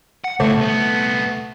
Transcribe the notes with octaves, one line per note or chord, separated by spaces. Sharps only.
F#5
A2 C#3 A3
C2 B3